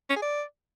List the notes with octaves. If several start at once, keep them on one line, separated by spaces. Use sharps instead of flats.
C#4
G#4
D5